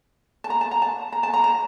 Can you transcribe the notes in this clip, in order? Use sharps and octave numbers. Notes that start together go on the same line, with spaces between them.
A5
A#5
A5
A#5
A5
A#5
A5
A#5
A#5